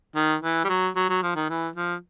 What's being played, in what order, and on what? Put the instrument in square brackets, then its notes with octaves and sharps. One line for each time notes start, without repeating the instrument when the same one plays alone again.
[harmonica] D#3
E3
G3
F#3
F#3
F#3
F3
D#3
E3
F3